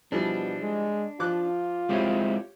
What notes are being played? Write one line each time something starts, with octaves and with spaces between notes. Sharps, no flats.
B2 E3 F3 G3 D4
G#3
F3 F4 D6 F#6
G#3 C4 E4 G4 C#5